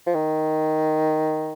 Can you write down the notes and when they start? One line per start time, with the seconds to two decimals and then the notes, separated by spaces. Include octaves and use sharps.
0.06 F3
0.15 D#3